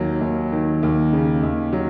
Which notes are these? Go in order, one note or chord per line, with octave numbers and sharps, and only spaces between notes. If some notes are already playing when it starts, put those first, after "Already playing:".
Already playing: D#2 D#3 F#3
D#2
D#3
D#2
C#3
D#2
F#3